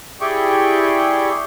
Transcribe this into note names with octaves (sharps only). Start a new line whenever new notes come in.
E4 G4 G#4 D5 G5 C#6